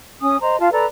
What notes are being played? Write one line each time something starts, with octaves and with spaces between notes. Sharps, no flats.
C#4 G#5 D#6
C5 D#5 A#5
F4 F5 A5
A4 B4 D5 A#5